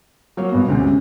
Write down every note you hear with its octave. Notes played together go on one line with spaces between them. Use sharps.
F#3 A#3 C#5
G2 B2 B3
D2 C3 G#3 C#4